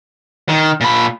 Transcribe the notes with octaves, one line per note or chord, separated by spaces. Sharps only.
D#3
A#2 B5